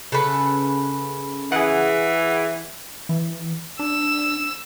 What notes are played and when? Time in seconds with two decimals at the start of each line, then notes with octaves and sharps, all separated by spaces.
0.12 C#3 A4 B4
1.52 E3 G#4 F#5
3.09 E3
3.79 D4 E6